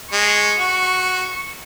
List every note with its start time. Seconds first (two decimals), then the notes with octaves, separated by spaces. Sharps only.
0.13 G#3 C#6
0.59 F#4